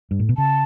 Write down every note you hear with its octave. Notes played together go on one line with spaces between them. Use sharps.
G2
A2
B2
C#3 A5